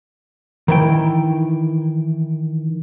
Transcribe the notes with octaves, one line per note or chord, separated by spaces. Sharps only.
D#3 E3 G5